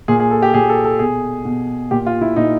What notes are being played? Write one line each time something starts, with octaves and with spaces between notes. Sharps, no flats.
A#2 G#4
G#4
A4
G4
A#2 G#4
A4
A4
B2 G#4
B2
A#2 G4
F4
E4
A#2 D#4